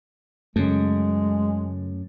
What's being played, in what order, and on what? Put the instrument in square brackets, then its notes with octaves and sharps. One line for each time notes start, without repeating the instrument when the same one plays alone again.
[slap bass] F#2 [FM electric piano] C#3 A3 [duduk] G#3